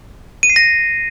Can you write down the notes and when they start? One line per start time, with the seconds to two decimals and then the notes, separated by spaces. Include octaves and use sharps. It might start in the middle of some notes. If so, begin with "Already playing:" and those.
0.43 D#7
0.50 C7
0.56 A#6